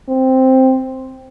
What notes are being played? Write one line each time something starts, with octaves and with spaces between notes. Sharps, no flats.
C4